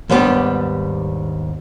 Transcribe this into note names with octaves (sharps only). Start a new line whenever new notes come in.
D#2 G#2 G3 B3 D4 G4